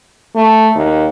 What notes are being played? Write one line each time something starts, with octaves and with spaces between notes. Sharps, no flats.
A3
D#2